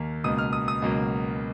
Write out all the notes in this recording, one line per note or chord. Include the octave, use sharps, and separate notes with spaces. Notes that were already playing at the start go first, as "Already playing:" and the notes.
Already playing: D#2 A#3
C#2 B2 A#3 D#6
F6
D#6
D#6
C#2 B2 F#3 A#3